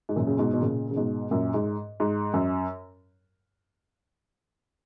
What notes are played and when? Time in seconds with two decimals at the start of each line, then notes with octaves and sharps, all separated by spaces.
0.09 G#2
0.16 F#2 A#2
0.27 C#3
0.39 G#2 B2
0.53 B2
0.62 A#2 C#3
0.91 C#3
0.96 G#2 B2
1.31 F#2 A#2
1.54 G#2
2.00 G#2
2.34 F#2